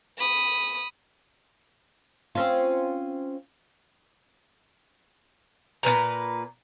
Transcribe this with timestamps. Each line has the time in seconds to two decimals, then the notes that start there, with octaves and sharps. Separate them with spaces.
0.18 B5 D#6
2.35 C4 C#4 F4
5.83 A#2 F3 B4 A#5